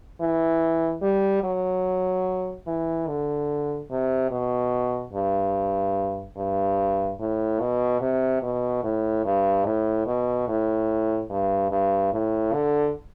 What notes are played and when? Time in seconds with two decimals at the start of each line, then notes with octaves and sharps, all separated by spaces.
0.20 E3
1.02 G3
1.43 F#3
2.67 E3
3.07 D3
3.91 C3
4.31 B2
5.13 G2
6.37 G2
7.20 A2
7.60 B2
8.01 C3
8.42 B2
8.83 A2
9.25 G2
9.65 A2
10.06 B2
10.48 A2
11.30 G2
11.71 G2
12.13 A2
12.53 D3